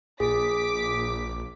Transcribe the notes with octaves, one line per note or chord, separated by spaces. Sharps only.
A#1 G#4 D6 B6